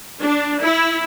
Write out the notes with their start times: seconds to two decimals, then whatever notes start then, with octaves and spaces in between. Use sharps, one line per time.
0.21 D4
0.62 E4